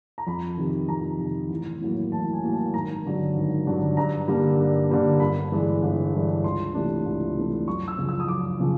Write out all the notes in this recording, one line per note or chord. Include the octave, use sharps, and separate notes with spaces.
A#5
F2 B5
C3 D#3
F2 A#5
C3 D#3
A1
A2 F#3 A#3
A1 A5
G#5
A2 F#3 A#3
A5
G#1 A#5
G2 D3 F#3
G#1
G2 D3 F#3
G2 A#5
D3 G3 A#3
G2
D3 G3 A#3
G1 B5
G2 E3 G#3
G1
G2 E3 G#3
C#2 C6
C3 E3 A3 D4
C#2
C3 E3 A3 D4
F#2 C#6
E6
C#3 F3
E6
D#6
F#2 D6
C#3 F3